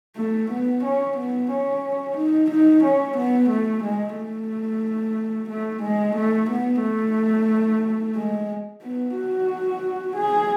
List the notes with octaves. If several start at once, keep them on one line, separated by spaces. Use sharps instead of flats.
A3
B3
C#4
B3
C#4
D#4
D#4
C#4
B3
A3
G#3
A3
A3
G#3
A3
B3
A3
G#3
B3
F#4
G#4